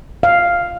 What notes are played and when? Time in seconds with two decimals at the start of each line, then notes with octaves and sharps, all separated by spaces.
0.23 F5